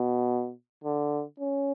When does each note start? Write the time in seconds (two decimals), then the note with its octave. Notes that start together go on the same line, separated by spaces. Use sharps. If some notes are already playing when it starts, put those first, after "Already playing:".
Already playing: B2
0.84 D3
1.40 C#4